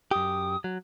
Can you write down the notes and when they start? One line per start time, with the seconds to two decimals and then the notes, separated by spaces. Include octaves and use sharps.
0.11 F#2 G4 D#6
0.64 F#3